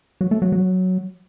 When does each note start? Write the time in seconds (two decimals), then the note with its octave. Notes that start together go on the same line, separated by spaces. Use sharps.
0.21 F#3
0.31 A3
0.42 F#3
0.52 F#3